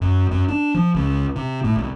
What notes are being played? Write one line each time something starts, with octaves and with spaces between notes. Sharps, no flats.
F#2
F#2
D4
F3
C#2
C3
A2
C2